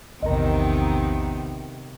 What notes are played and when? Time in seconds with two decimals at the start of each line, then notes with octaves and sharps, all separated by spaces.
0.22 A#1 E2 C3 D#3 B3 A#4 D#5 A#5